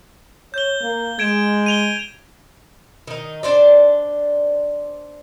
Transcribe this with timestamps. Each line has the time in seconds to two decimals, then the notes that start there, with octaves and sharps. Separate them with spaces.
0.54 C#5 G6 G7
0.82 A#3
1.19 G#3 G#6 D7 E7
1.66 D#7 F7 G7
3.07 D#3 D#4
3.43 D4 C5 D5